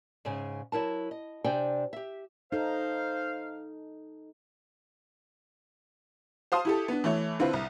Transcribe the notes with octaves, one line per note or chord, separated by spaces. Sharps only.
G#2 C#3 G#5
F#3 E4 A#4 A5
D#5
C3 D4 C5 D5 G5 G#5
G4 E5
D#4 A4 C5 F5
C5 F5 A5 C6 D#6
E4 G4 A4
B3 D4
E3 A3 C#5
D3 C4 E4 F4 B4
C2